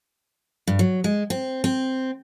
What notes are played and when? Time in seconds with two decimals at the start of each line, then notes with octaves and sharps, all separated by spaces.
0.67 G2
0.79 F#3
1.04 G#3
1.30 C4
1.64 C4